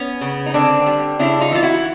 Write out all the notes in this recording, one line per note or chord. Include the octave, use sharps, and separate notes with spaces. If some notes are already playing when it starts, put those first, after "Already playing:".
Already playing: B3 C#4
C#3
D#4
D3 C4 D4
G3
C#3 D4 E4
D#4 F4
E3 F4
E4 F#4